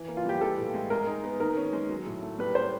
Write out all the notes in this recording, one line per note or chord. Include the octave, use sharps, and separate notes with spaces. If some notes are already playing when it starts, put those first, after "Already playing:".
Already playing: E3
A#3
F4
G3 G4
E3 A4
A2
G#3
G#3 A#4
D#4
B3
D#3 A#4
C#4
G#3
F#3
A2
A3
G3 B4
C#4 C5